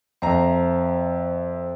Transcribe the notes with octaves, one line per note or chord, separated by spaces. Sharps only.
F2 C5 E5 A#5